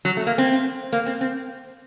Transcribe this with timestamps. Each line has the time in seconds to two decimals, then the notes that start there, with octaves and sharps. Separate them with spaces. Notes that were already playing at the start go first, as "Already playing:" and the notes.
0.05 F#3
0.17 A3
0.27 A#3
0.38 C4
0.93 A#3
1.06 C4
1.21 C4